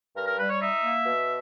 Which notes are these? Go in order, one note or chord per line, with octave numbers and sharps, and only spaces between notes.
G2 A#4
A#4
G3 B4
C#5
D#4 E5
A#3
B2